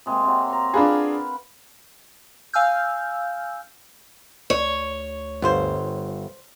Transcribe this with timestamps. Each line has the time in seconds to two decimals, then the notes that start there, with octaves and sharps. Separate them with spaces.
0.06 C3 G#3 A#3
0.24 C3 F#3
0.48 A#5 C6
0.74 D4 F4 G#4 B4 F5
2.54 F5 G#5 E6 F6 G6
4.50 D2 C#5
5.42 G1 B3 F4 C5